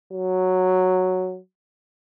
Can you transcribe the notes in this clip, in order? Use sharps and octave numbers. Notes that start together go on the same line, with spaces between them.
F#3